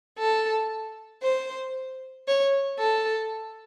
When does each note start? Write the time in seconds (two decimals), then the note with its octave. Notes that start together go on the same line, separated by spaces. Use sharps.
0.19 A4
1.23 C5
2.27 C#5
2.79 A4